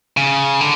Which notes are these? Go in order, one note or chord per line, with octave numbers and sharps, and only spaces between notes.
C#3
D3